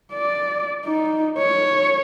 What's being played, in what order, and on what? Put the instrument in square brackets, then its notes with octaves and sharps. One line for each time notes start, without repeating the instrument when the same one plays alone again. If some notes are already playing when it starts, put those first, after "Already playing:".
[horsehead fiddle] D5
D#4
C#5